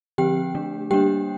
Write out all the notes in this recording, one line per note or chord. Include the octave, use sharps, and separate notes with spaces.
D3 F3 C4 G4 G5
D3 A3 D4
G3 A#3 D4 G4 G5